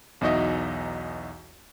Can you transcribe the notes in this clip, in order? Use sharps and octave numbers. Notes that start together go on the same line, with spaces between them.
B1 E2 D#4 F#4 D#5 E5